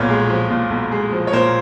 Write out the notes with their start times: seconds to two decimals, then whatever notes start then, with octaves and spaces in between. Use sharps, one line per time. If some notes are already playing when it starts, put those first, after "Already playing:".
Already playing: B1 A#2 B4 C#5
0.09 G#3
0.30 F3
0.50 A#2
0.70 B1
0.91 G#3
1.12 F3
1.27 C#5
1.33 A#2 A#4 C5